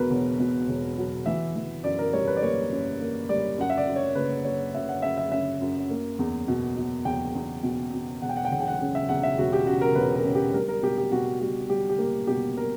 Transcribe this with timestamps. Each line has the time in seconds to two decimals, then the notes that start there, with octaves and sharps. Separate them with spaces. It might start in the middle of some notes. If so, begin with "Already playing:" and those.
Already playing: E1 B2 F#3 A#4 B4
0.10 E1
0.39 B2
0.68 E1
0.97 F#3
1.26 E3 E5
1.56 E3
1.83 F#2 D5
1.99 A#4
2.13 G3 C#5
2.27 B4
2.37 D5
2.41 A#3 C#5
2.71 F#2
3.01 A#3
3.29 G3 D5
3.58 F#2 F#5
3.70 E5
3.77 D5
3.87 F#2
3.96 C#5
4.15 F#1 B4
4.45 F#1 C#5
4.74 F#2 E5
4.89 F#5
5.02 C#3 E5
5.17 E5
5.32 C#3 E5
5.61 F#2
5.90 A#3
6.19 E2
6.48 B2
6.77 B2
7.05 E2 G5
7.35 E2
7.63 B2
7.93 B2
8.22 E1 F#5
8.29 G5
8.37 F#5
8.45 G5
8.51 E1 F#5
8.60 G5
8.67 F#5
8.80 C#3
8.95 E5
9.09 E2 F#5
9.23 E5
9.38 E1 F#4
9.53 G4
9.67 C#3 F#4
9.81 A#4
9.95 E1 B4
10.16 A#4
10.24 C#3
10.35 G4
10.54 G3 A#4
10.68 A#4
10.82 B2 G4
10.98 G4
11.12 B2 F#4
11.40 G3 F#4
11.69 G3 G4
11.89 G4
11.98 A#3
12.27 B2 G4
12.57 A#4